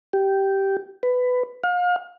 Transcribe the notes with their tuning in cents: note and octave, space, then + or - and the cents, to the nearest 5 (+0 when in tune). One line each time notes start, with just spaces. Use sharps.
G4 -10
B4 +15
F5 +35